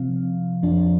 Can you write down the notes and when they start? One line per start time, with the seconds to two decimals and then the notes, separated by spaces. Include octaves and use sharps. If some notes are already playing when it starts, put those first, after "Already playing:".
Already playing: C3 F3 C4 F5
0.63 F2 F3 D4